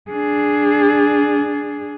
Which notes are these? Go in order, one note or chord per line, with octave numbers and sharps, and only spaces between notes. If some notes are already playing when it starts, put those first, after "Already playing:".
D4 G#4